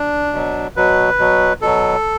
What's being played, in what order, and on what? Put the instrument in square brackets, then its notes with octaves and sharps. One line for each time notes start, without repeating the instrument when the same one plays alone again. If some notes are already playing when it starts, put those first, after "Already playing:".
Already playing: [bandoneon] D4
B2 F#3
B2 F#3 B4
B2 F#3
B2 F#3 A4